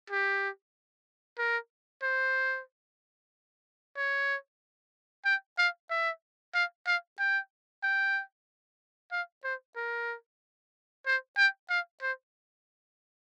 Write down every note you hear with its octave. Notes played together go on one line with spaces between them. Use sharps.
G4
A#4
C5
C#5
G5
F5
E5
F5
F5
G5
G5
F5
C5
A#4
C5
G5
F5
C5